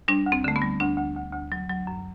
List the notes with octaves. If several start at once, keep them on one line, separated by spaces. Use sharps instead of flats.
G3 D4
D2
C4
D3 A3
B3
G3
D2 D4
D2
D2
D2
F#3
F#3
F#2